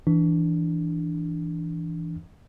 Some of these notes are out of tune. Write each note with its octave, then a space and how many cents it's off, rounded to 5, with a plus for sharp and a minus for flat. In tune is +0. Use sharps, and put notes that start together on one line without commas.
E3 +0 D4 +0